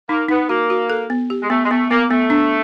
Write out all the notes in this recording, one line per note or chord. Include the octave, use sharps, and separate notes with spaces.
A#3 D#4
B3 D#4
A#3 F#4
F#4
A4
B3
G4
G#3
A3 B3
G#3
A3 B3
A#3 B3
A3 B3
D4